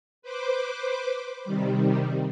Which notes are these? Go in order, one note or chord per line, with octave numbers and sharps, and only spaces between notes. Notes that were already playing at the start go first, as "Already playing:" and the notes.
B4 C5 D6
C3 D#3 G3